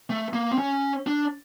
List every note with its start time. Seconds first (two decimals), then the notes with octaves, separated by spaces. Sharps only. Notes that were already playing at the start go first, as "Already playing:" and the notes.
0.10 A3
0.33 A#3
0.51 C4
0.58 C#4
1.07 D4